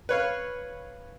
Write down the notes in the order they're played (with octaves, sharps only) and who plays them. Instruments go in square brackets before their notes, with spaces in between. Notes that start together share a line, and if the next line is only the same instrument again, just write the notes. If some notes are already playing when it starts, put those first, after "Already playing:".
[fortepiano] B4 C#5 F5